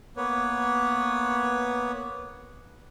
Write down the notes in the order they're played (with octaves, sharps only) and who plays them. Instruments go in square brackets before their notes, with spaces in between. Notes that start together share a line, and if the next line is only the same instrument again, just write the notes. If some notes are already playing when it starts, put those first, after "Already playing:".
[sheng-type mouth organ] A#3 B3 B4 C#5